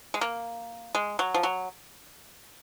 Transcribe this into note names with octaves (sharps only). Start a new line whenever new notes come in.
G#3
A#3
G#3
F#3
F3
F#3